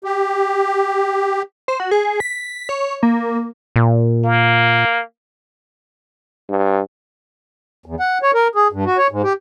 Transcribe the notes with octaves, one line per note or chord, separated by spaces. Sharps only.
G4
C5
F#4
G#4
B6
C#5
A#3
A#2
A#3
G2
E2
F#5
C#5
A#4
G#4
G2
F#4
C#5
G#2
G4